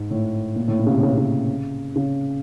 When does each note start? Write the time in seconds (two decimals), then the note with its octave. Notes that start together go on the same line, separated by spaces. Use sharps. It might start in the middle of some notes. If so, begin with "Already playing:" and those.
Already playing: G#2
0.11 A2
0.56 A#2
0.68 A2
0.79 A#2
0.87 C#3
0.91 C3
1.03 C#3
1.10 C3
1.18 C#3
1.96 C#3